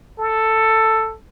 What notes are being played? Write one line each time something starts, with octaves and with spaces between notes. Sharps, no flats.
A4